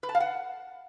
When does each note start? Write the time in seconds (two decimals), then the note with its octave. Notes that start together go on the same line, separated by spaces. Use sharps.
0.03 B4
0.09 A5
0.15 F5
0.20 F#5